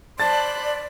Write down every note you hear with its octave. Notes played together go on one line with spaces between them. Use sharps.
C5 D5 A5 B5 F#6 A6